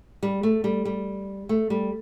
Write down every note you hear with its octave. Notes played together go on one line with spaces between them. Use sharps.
G3
A3
G3
G3
A3
G3